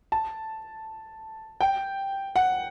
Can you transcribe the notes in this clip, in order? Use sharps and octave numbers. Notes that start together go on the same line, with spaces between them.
A5
G5
F#5